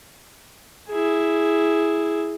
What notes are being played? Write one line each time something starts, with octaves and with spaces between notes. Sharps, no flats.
E4 G#4